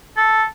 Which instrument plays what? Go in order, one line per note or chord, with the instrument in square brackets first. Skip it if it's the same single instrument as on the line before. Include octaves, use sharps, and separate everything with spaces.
[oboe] A4